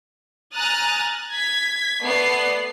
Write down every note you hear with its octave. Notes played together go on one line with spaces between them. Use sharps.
G#5 A#5 D#6 F6 F#6 A6
G#6 B6
A3 B3 D5 C7